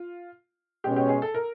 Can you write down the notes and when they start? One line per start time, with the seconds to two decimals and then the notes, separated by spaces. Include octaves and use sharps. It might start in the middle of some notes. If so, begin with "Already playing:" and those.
Already playing: F4
0.84 B2 G#3 C#4 G4
0.96 G4
1.09 G#4
1.22 A4
1.34 A#4